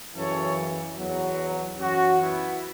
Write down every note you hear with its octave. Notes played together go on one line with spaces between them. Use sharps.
F#2 C#3 E3 A4 C#5
E2 B2 F#3
F#2 E3 C#4 F#4
B3 E4